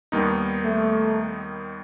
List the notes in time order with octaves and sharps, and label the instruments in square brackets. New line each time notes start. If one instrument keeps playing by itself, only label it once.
[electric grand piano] D#2 D#3 G3 B3 D#4
[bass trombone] A3